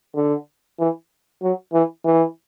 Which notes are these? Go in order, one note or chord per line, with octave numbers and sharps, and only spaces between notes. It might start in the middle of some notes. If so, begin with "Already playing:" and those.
D3
E3
F#3
E3
E3